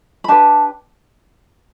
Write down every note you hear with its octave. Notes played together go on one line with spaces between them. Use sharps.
B5
D4 G4 B4 A5